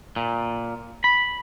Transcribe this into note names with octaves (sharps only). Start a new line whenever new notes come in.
A#2
B5